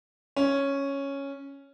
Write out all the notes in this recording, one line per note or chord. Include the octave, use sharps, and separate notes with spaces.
C#4